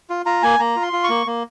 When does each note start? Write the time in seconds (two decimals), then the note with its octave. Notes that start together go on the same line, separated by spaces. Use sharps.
0.10 F4
0.26 F4 A#5
0.43 A#3 G#5
0.59 A#3 A#5
0.76 F4
0.82 C6
0.93 F4
1.04 C#6
1.09 A#3
1.27 A#3